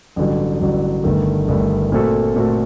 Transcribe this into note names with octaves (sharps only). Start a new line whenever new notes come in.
A1 G2 D3 F#3
A1 G2 D3 F#3
G1 G2 D#3 A3
G1 G2 D#3 A3
A#2 A3 C4 F#4 A4
A#2 A3 C4 F#4 A4